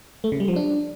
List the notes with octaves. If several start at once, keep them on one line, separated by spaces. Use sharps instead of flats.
A3
C#3
G3
F3
D4